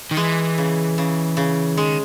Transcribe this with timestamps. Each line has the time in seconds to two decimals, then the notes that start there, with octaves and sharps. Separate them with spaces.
0.11 D#3
0.17 E3 G#3
0.58 C#3
0.98 C#3
1.37 C#3
1.77 D#3 G#3